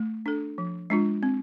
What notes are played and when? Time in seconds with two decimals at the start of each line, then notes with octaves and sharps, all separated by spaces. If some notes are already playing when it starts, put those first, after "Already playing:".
Already playing: A3
0.26 D4 A4
0.58 F3
0.90 G#3 D4 F4
1.23 C4